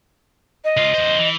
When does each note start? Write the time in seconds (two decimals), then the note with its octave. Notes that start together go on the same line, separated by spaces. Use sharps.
0.64 D#5
0.77 C#2 F4
0.94 E2 C5
1.19 E3